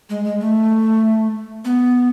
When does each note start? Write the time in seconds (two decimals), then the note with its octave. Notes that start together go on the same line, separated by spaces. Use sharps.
0.10 G#3
0.25 G#3
0.40 A3
1.65 B3